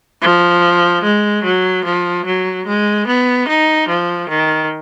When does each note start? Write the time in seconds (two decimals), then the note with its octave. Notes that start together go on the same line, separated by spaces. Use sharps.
0.22 F3
1.03 G#3
1.43 F#3
1.85 F3
2.25 F#3
2.66 G#3
3.07 B3
3.48 D#4
3.88 F3
4.29 D#3